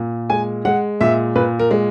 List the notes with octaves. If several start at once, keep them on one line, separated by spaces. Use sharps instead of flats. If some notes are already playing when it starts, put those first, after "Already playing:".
Already playing: A#2
G#3 G#5
G#3 F#5
A#2 E5
A#2 B4
A#4
G#3